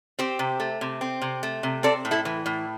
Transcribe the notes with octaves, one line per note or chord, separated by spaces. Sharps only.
C4 G4 C5
C3
A3
C3
C4
C3
A3
C3
C4 A4 D5
A2
E4 A4
E3
A2